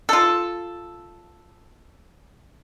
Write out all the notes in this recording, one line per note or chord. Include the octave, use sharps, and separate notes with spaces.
F4 A4